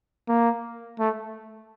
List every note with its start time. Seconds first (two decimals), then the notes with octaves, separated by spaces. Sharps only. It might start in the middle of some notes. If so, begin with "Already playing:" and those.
0.28 A#3
0.99 A3